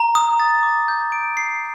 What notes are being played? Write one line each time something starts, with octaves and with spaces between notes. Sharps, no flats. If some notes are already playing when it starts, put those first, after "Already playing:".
Already playing: A#5
D#6
A6
D6
G6
D7
C7